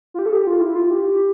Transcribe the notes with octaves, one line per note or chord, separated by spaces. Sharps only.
F4
G4
A4
G4
G4
F4
E4
F4
G4